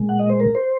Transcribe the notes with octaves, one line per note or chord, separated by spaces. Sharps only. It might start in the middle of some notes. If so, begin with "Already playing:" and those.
Already playing: A#2 G#3
F#5
D#5
C5
A#4
C5